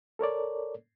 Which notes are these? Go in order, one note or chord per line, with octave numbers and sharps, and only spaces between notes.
A4 A#4 C#5 D5